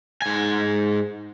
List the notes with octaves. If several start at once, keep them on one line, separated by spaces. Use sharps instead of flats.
G#2 G#5